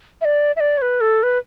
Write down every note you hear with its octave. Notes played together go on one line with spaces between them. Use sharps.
E5
D5
E5
D5
C#5
B4
A4
B4